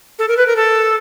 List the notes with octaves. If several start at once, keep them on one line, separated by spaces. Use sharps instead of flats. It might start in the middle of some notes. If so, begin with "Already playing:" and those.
A4
A#4
B4
A#4
A4